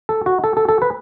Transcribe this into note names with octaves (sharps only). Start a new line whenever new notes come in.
A4
F#4
A4
A4
A4
B4